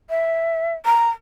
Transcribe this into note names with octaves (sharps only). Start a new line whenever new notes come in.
E5
A#5